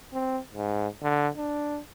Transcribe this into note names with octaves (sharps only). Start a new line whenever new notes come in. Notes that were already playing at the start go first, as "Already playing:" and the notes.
C4
G#2
D3
D4